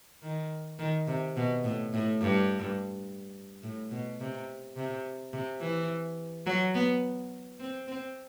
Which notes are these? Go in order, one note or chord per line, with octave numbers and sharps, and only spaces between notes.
D#3
D#3
C3
B2
A2
A2
G2
A2
B2
C3
C3
C3
E3
F#3
B3
C4
C4